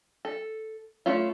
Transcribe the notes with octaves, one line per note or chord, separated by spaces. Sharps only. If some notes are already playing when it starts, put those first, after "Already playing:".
A4
A3 C#4 E4 F4